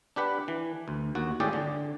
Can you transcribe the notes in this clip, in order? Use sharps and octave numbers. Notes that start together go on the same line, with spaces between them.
D4 G4 B4 F#5
E3
D2
D#2 F#4
G#1 A2 G4 G#4 D5 G5
D3